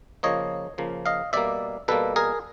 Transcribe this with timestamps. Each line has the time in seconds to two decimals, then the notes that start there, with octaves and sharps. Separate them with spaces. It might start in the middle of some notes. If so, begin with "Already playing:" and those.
0.23 C#3 F3 A#3 C#5 D#5
0.78 C#3 F3 A#3
1.06 D#5 F5
1.33 B2 G3 A#3 D5 E5
1.88 B2 G3 A#3 A4 B4
2.16 G#4 A#4